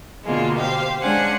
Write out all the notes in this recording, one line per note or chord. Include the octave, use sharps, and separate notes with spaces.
B2 D3 G#3 A#3 F4
G4 C5 F5
G#3 C#4 D4 C5 F#5 G#5